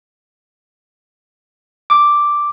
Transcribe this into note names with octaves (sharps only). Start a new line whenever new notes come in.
D6